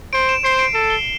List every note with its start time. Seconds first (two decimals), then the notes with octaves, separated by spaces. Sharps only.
0.13 C5 D7
0.29 E7
0.44 C5 C7
0.59 D7
0.74 A4 E7
0.90 G7